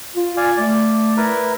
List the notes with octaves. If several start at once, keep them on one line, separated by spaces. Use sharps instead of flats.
F4
D5 F5 G#5
A3 D5
E4 A#4 B4